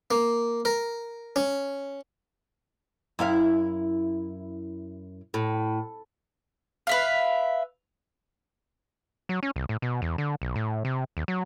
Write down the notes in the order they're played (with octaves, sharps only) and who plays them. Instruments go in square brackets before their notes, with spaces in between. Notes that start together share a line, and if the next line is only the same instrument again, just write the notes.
[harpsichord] A#3
A#4
C#4
[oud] F#2 E4 F5
A2
[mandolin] B4 E5 F5
[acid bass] F#3
C#4
C2
A2
B2
E2
D3
B1
A2
C3
D#2
F#3